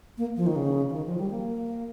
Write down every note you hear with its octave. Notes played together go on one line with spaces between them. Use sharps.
A#3
F3
D#3
C#3
F3
D#3
F3
G3
A#3